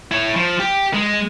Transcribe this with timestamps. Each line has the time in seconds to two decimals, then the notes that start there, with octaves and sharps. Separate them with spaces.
0.11 E4 C#5
0.36 F3
0.59 G4
0.94 G#3